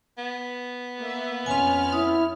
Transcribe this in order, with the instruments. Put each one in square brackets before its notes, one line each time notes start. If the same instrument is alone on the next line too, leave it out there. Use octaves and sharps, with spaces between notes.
[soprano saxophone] B3
[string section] A#3 E5
[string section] F2 C#4 F6 [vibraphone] G#5 C6
[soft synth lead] E4 [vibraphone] D#6